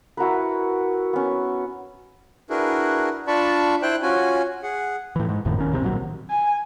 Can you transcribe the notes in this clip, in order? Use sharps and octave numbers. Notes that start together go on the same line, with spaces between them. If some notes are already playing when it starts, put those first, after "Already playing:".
E4 F#4 A#4 B4
B3 C#4
D4 E4 F#4 G#4 A#4 B4
D4 F4 D5 A5 B5 C#6
E4 C5 G5 F#6
C#4 F4 F#4 G#5
G#4 F#5
A2 E3
G#2
G#1 F2 A2 D#3
F#1 D#3 C#4
C#2 C3 G#3 C4
A1 A#2 D#3 F#3
G#5